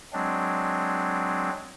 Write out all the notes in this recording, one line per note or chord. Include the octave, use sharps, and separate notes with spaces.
F#3 G#3 C4 D4